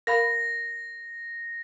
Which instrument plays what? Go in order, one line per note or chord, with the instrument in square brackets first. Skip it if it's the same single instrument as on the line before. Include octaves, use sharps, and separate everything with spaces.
[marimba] A#4 F5 B5 [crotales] A#6